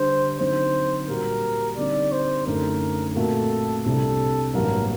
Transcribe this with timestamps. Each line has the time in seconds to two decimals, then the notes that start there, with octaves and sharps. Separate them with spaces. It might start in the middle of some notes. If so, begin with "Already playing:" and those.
Already playing: D3 G3 D4 C5
0.39 D3 F#3 C4 D#4 C5
1.08 A#2 G3 A#3 F#4 A#4
1.77 D3 G3 C4 D#4 D5
2.12 C5
2.46 F#2 D3 A3 D#4 A4 A#4
3.15 A#2 A3 C4 F#4 A4 A#4
3.85 C2 C3 G3 D4 G4 A4
4.54 A1 G2 F#3 A#3 A#4